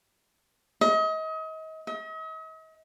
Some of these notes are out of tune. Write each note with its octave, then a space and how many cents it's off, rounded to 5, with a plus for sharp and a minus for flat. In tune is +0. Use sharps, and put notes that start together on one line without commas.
D#5 +35
D#5 +45